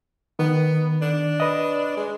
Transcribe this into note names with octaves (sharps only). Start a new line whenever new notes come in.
D#3 B3
D4
B4 D#5
G#3